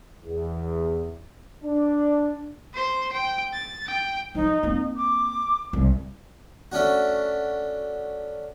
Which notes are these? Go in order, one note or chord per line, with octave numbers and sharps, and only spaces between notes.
E2
D4
C5 C6
G5
A6
G5
F3 D#4
A#3 C4
D6
C2
A3 C#4 D4 F#4